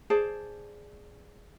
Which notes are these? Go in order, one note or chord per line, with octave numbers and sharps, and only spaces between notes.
G#4 C5 D5 A5